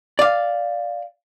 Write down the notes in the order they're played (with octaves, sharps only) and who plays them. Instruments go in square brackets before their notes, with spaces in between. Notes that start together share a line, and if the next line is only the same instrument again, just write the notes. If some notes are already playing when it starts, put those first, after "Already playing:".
[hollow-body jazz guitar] D5 F5